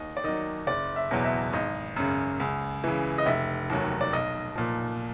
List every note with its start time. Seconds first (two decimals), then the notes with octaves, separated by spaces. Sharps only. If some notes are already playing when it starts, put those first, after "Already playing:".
Already playing: D#2 D#5
0.17 D5
0.24 D#3 F#3 D#5
0.67 F#1 D5
0.96 E5
1.11 E2 B2 F#3
1.24 E5
1.53 G#1 D#5
1.96 F#2 C#3
2.40 C#2
2.84 C#3 E3
3.18 D#5
3.26 F1 E5
3.70 D#2 D#3 F#3
4.01 D5
4.13 B1 D#5
4.55 A#2 F3